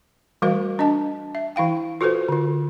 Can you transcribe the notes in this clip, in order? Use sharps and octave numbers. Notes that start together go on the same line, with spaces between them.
E3 G3 A3 F#4 A#4 F5
D4 D#5 A5
E5
E3 E4 F5 G5
F4 F#4 A4 B4 C5
D3 F4